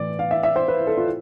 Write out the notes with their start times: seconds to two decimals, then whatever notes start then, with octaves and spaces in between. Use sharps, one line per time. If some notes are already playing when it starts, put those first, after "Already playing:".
Already playing: A2 E3 D5
0.19 F5
0.31 E5
0.43 E5
0.56 C5
0.68 B4
0.87 A4
0.97 F4